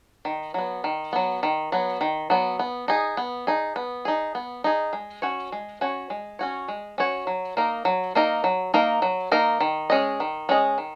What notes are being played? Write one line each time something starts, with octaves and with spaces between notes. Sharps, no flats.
D#3
F#3 B3
D#3
F#3 B3
D#3
F#3 B3
D#3
F#3 B3
B3
D#4 G#4
B3
D#4 G#4
B3
D#4 G#4
B3
D#4 G#4
G#3
C#4 F#4 C#5
G#3
C#4 F#4 C#5
G#3
C#4 F#4 C#5
G#3
C#4 F#4 C#5
F#3
A#3 D#4 A#4
F#3
A#3 D#4 A#4
F#3
A#3 D#4 A#4
F#3
A#3 D#4 A#4
D#3
G#3 C#4 G#4 D#5
D#3
G#3 C#4 G#4 D#5
D#3